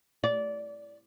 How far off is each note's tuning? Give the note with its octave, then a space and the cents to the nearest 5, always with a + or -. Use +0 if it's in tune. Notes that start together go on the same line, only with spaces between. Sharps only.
D5 -20